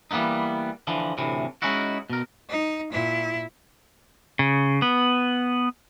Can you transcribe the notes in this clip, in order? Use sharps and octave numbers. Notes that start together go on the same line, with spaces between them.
E3 G3 A#3 B3 D#4
D3 E3 F3
D2 A2 C3 E3
G#3 C#4 D#4 E4 F#4
B2 A#4
D#4
A#2 E4
C#3
B3